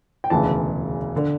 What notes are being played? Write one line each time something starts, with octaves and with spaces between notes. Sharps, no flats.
G5
E1 D2 C#3 E3 A5
D3